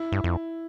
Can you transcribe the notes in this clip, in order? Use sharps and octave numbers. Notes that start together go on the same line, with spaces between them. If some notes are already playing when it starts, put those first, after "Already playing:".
Already playing: E4
G2
F2